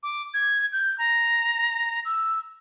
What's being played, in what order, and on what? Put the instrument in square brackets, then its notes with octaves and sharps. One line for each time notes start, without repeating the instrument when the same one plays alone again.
[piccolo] D6
G#6
G6
A#5
E6